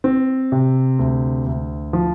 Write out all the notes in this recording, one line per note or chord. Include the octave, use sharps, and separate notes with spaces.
C4
C3
D2
D2
F3